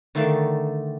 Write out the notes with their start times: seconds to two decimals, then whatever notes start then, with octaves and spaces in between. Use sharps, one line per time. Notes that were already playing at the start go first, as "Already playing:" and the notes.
0.15 D3 D#3 A3 F5